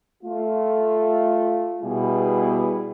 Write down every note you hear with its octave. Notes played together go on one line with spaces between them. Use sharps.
A3 F4
B2 G3 B3 E4 G#4